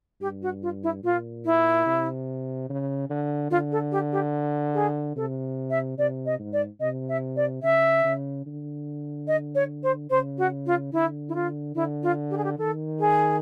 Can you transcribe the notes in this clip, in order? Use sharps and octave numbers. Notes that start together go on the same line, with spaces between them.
G2 G4
F#4
F4
E4
A#2 F4
E4
C3
C#3
D3
D3 F4
A4
G4
G4
G#4
C3 A4
E5
C3 D5
D#5
G#2
D5
C3 D#5
E5
D5
C#3 E5
C#3
D3
D#5
C#5
C5
C#3 C5
F#4
F4
D3 E4
E4
F4
D3 E4
F4
G4
G#4
G4
D#3 A4
G#4